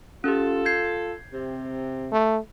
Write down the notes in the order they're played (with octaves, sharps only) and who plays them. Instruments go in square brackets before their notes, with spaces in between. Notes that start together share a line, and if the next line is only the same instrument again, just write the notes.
[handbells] C#4 G4 [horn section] F4 A4
[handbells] G6 G#6 C7
[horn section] C3
[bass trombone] A3